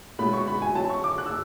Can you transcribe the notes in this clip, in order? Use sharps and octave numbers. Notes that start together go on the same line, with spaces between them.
B2 G#3 C#4 E4 B5
C#6
B5
G#5
F#3 C#4 E4 A5
C#6
D6
F#6
E6